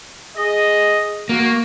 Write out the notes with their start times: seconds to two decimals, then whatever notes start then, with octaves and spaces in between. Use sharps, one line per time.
0.36 G#4 D#5
1.29 A#3 F#4